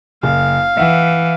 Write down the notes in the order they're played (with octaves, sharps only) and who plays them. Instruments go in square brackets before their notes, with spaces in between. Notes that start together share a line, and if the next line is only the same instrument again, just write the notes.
[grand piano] F#1 [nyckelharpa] F5
[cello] E3 [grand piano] E5 F#5